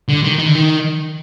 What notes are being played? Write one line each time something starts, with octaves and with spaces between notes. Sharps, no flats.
D3
D#3
D#3
D3
D#3